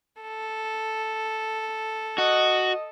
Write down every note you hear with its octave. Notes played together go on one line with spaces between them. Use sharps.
A4
F#4 D#5